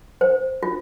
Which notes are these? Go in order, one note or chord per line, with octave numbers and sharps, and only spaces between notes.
C5
F4